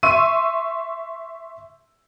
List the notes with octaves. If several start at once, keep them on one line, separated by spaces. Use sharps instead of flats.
E5 C6 C#6 E6 D#7